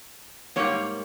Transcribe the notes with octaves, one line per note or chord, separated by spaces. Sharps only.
G#2 G3 A#3 C#5